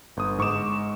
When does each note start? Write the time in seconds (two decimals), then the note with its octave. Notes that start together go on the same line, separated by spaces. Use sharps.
0.17 G1 D#6
0.38 G#2 C#6 D6 E7